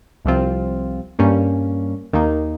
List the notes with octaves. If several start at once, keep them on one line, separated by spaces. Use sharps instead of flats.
C2 C3 F3 C4 F4
G2 G3 A#3 C#4
D#2 D#3 A#3 D#4